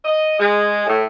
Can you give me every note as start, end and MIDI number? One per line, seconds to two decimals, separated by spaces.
0.05 0.38 75
0.39 0.85 56
0.87 1.02 45